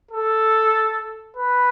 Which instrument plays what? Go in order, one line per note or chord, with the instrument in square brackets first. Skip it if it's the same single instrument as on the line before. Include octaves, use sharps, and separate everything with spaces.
[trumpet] A4
B4